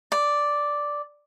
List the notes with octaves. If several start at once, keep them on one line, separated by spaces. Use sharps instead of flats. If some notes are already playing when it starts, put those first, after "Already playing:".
D5